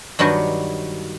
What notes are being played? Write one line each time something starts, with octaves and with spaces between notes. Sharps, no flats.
G2 D#3 F#3 F#4 G#5